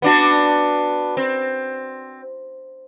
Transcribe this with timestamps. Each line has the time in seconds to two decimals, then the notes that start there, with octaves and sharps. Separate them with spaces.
0.02 B3 D4 F#4
1.17 C4